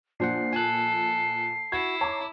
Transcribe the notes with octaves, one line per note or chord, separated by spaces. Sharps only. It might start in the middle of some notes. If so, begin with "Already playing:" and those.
A#2 F3 D4 C5 F#5 C7
A4 G#5 F#6
E4 F#4 G#6
C#5 A5 A#5 D6